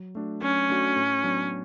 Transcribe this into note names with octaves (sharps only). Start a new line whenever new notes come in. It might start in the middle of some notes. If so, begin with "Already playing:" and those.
Already playing: F#3
A3 D4 F#4
F#3 C#4
A3 D4 F#4
A2
F#3 B3 D4